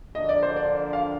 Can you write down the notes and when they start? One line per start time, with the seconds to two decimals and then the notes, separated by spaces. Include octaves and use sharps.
0.15 D3 F3 A#3 D4 D#5
0.29 D5
0.43 C5
0.56 D5
0.93 F5